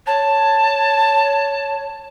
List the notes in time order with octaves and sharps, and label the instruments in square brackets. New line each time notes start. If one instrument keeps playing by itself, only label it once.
[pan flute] C#5 [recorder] A5